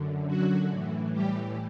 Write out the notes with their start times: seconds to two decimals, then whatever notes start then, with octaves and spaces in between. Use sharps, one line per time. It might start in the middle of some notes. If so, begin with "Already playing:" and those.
Already playing: F#2 D3
0.27 F#3 F#4
0.70 A2
0.75 E3
1.13 G3 G4